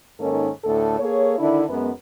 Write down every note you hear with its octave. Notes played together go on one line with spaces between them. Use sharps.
G#2 D#3 A#3 C#4 A4
D2 A2 A4
A#3 G#4 A4 C#5
D3 D#3 D4 E4
F#2 G#3 B3